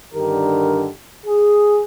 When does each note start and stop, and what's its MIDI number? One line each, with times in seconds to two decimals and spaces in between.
0.14 0.88 43
0.14 0.88 50
0.14 0.88 51
0.14 0.88 67
0.14 0.88 70
1.26 1.82 68